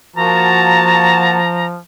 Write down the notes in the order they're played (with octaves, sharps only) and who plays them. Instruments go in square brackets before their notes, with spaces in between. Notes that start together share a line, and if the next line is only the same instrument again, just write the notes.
[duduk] F3 [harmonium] A#3 F#4 [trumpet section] A5 [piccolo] A#5